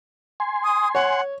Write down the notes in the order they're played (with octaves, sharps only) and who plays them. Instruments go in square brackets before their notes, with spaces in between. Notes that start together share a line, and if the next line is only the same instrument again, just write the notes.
[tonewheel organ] G#5 C6
[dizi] D#6
[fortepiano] C#5 [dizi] F#5